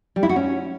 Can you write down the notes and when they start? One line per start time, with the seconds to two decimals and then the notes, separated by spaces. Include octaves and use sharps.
0.16 G3
0.23 E4
0.29 F#4
0.36 C#4